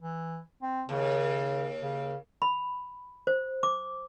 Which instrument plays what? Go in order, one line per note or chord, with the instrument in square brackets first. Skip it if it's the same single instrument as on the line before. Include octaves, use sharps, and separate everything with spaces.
[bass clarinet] E3
C4
[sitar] D#2 [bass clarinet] C#3
[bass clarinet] C#3
[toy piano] B5
C5
D6